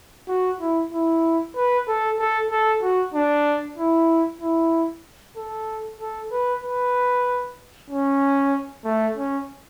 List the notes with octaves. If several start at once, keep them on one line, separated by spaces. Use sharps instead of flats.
F#4
E4
E4
B4
A4
A4
A4
F#4
D4
E4
E4
A4
A4
B4
B4
C#4
A3
C#4